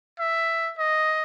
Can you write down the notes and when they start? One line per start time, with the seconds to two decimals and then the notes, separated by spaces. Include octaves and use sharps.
0.19 E5
0.78 D#5